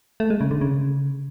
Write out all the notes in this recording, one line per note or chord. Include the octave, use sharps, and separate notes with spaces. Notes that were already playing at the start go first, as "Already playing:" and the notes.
A3
G#3
C#3
D3
C#3